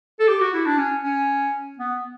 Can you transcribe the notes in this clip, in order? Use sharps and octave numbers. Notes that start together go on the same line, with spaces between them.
A4
G4
F#4
E4
D4
C#4
C#4
B3